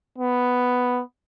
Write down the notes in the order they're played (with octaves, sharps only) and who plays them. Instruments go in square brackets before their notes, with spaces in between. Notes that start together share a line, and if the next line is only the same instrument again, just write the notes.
[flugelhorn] B3